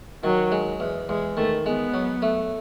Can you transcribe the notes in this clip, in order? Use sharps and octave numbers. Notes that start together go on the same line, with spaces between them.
D#3 F#3
G#3
E2
E2 G#3
D#3 A3
G#3 B3
F#3
A3